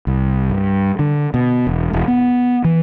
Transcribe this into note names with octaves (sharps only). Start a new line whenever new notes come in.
C2
G2
D3
B2
E1
E1
B3
E3